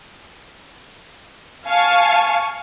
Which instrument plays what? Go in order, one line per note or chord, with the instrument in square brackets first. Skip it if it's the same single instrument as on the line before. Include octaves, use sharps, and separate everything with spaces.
[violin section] F5 G#5 A5 C#6